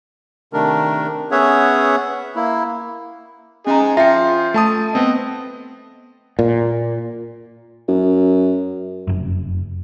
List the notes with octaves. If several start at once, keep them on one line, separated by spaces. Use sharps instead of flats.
C3 D#3 A3 D4 A#4
B3 C#4 G#4 C#5 E5 F#5
A#3 E4
C#4 D#4 G#4 A#5
F3 F4 E5 G5
A3 A5 D#6
B3 C4 D#5
A#2
F#2
F1 F#2